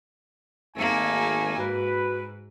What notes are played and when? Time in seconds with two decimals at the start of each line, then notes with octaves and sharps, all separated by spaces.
0.77 G#1 A3 A#3 G#5
1.59 G#2 F#4 B4